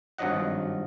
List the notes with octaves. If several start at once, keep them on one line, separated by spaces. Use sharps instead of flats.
G#1 G2 F3 F#3 D#5 F#5